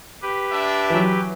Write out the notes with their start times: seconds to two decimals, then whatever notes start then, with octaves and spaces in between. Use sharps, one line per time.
0.22 G4 B4
0.52 D4 E5
0.90 E3 F#3